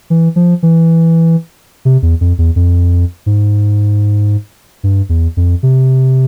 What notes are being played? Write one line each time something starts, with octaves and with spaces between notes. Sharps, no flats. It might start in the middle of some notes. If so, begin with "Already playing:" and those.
E3
F3
E3
C3
E2
F2
E2
F2
G#2
G2
E2
F2
C3